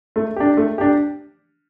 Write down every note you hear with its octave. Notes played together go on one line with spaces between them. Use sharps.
A3
D4 G4
A3
D4 G4